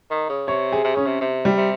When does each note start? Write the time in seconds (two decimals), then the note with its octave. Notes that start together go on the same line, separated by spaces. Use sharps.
0.11 D#3
0.29 C#3
0.48 C3 C#5
0.72 G#4
0.84 C3
0.95 C#3 C#4
1.07 C3
1.21 C3
1.45 G3
1.57 C3